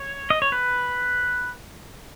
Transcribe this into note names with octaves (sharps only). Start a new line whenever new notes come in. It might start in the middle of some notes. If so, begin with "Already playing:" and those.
Already playing: C#5
D#5
C#5
B4